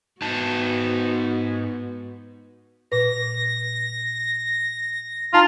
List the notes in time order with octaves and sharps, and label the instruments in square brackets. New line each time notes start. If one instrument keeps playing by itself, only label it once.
[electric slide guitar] G#2 D#4 A5 [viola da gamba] B3 F#4
[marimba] A#2 B4 [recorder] A#6
[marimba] D#4 A5 A#5 [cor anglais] F4